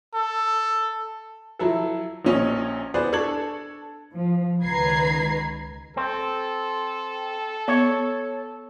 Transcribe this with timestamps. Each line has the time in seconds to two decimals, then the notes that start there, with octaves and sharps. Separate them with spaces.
0.14 A4
1.59 F3 F#3 E4 A4
2.25 A#1 A#2 C#4 C#5 D#5
2.94 B3 G#4 B4 C5 D5
3.12 D4 A4 A5 C#6 G#6 F#7
4.13 F3
4.64 C#2 D#3 B4 A#5 G#6 C7
5.97 C4 A4
7.68 B3 C#5